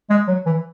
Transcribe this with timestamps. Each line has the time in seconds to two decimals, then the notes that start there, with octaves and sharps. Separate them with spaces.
0.10 G#3
0.28 F#3
0.46 E3